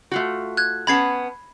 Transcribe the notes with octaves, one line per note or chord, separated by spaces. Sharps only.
A3 F4 F#4
F#6 G#6
B3 C#4 A5 B5 G#6 C7